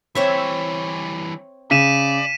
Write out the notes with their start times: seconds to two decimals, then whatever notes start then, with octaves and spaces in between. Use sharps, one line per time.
0.15 E3 G3 C4 C#5 E5
1.71 C#3 D5 B6 D#7 E7